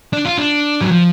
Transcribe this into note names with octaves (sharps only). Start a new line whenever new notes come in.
D4
F4
D4
F#3
F3